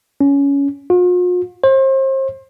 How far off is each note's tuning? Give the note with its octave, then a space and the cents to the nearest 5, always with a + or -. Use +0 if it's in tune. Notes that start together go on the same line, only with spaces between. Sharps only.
C#4 +15
F4 +45
C5 +35